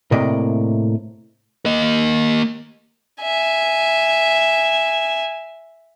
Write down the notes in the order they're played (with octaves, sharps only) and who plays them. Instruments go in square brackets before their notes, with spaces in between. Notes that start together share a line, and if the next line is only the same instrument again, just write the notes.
[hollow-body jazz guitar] A2 C3 A#3 D5 D#5
[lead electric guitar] A#3 D#5
[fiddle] E5 G#5